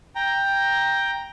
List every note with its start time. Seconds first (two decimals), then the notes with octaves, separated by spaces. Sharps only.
0.15 G5 A#5